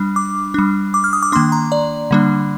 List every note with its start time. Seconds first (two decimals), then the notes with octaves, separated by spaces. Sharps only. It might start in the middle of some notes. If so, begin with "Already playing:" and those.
Already playing: G3 D4
0.16 D6
0.54 G3 D4
0.94 D6
1.04 F6
1.13 D#6
1.23 D6
1.32 D#3 A#3 D4 C6
1.52 A#5
1.72 D5
2.11 D3 G3 A#3 D4